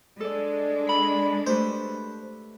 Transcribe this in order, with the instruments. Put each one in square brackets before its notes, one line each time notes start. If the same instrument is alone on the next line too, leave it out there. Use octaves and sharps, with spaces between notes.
[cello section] G#3 D4 [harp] A4 D5
[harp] A4 [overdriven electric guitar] B5
[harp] A3 G4 B4 [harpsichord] C5